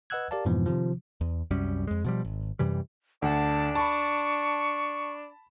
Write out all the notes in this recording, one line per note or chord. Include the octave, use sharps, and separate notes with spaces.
B4 D#5 F#5 E6 F#6 G#6
G4 A#4 D5 F5 A5
F2 G#2 B2 E3 F3 B3
C3 D#3 F3
E2
C2 F#2 G3 C#4
F2 G#3
B2 F3 G3
G#1
F#2 C3 E3 G3
D2 D4 F#5 A5
A5 B5 C#6